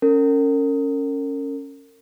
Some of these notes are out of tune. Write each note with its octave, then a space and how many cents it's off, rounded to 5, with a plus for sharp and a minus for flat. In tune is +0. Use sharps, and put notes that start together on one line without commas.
C#4 +0 A#4 -35